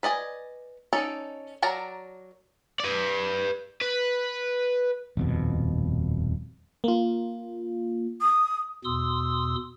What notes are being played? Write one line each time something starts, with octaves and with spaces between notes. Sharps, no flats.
B4 D5 D#5 G#5
C#4 D#4 A4 D5
F#3 A#4 D5 A5 A#5
B4 D5
B4
D#1 F2 B2
A#3 F4
D#6
E2 B2 C6 D#6 E6